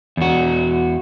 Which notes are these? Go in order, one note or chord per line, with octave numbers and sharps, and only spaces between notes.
E2 F#4